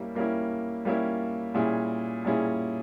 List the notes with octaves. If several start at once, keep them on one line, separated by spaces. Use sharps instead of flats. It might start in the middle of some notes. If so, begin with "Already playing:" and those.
Already playing: G3 A#3 C#4 E4
G3 A#3 C#4 E4
G3 A#3 C#4 E4
A#2 G3 C#4 E4 G#4
A#2 G3 C#4 E4 G#4